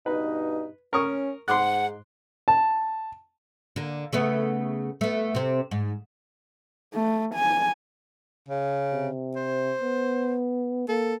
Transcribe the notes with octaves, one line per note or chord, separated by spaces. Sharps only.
G2 B2 D#4 B4
C#4 A#4 C#6 D#6
G#2 F#5 C6 D6 F#6
A5
D3 A#3
C#3 A3 B3
A3 B3
C3 C4
G#2
A3
G#5
C#3
C3
C5
B3
A#3 A4